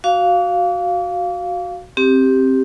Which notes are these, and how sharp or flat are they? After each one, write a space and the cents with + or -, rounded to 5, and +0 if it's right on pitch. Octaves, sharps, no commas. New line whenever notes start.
F#4 +0 F5 +0 D6 -40
C4 +15 G4 +0